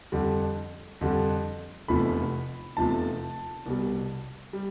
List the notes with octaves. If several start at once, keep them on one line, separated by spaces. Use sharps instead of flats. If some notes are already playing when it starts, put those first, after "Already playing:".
F2 D3 G3
F2 D3 G3
F1 E2 C3 F3 A3 B5
F1 E2 C3 F3 A3 A5
C2 B2 G3
G3